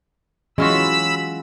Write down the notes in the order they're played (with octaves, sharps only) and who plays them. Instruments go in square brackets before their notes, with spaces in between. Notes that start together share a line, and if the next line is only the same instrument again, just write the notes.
[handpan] E3 F#3 C#4 [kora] G#3 F4 F#4 [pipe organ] B5 E6